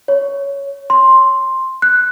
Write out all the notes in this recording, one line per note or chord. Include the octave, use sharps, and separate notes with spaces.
C#5
C6
F#6